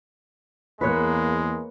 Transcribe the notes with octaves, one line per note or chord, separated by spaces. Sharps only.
E2 G#3 A#3 B4 C#5 F#6